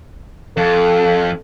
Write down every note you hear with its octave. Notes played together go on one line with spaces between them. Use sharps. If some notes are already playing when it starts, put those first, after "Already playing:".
F2 A4